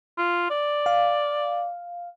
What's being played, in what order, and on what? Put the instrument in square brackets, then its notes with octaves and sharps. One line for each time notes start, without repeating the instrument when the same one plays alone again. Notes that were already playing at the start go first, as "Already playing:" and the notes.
[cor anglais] F4
D5
[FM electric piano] F5